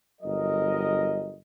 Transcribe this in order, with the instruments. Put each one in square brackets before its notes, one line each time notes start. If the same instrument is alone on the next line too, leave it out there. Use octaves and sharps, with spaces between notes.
[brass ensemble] G1 F#3 A#4 D#5